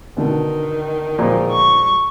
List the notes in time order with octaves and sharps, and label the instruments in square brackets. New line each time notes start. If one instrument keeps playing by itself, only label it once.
[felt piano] B2 D3 [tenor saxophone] D#3
[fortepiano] A#2 F3 G#3
[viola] C#6